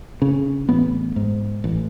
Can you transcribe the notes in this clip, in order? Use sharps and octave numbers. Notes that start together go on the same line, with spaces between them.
C#3
A1 B3
G#2
A1